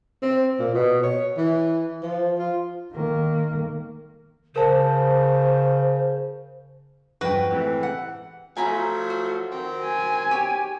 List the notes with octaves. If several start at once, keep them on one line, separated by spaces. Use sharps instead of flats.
C4
A#2
B2
C#5
E3
F3
F4
D#3 A#3
C#3 A#4 C5 A5
E2 G2 F3 F#4 B4 G5
A2 E3 G#3 C4 G4
F#5
F3 F#3 A3 G#5 A#5 B5
F#4
D#3 F#3 C4
G#5
G4 C#5